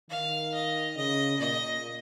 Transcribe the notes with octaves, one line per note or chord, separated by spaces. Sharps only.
D#3 F5
D#5
C#3 D#5
A#2 D#5